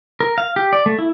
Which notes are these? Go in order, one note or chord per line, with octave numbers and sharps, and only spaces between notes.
A#4
F5
G4
D5
A3
E4